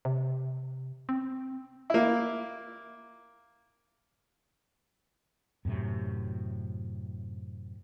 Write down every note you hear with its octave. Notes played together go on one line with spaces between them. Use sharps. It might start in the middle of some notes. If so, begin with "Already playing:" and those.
C3
C4
A#3 E4
F#2 A2 C3